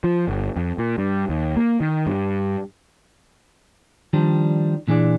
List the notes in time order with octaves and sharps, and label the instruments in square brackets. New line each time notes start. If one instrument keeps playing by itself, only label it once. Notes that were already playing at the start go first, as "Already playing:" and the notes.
[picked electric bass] F3
G1
F2
A#2
G2
D#2
A#3
D#3
G2
[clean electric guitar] D#3 F3 G3 D4
A#2 E3 D4 G#4 D5